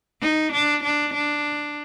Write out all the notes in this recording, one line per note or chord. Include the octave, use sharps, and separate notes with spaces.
D#4
D4
D4
D4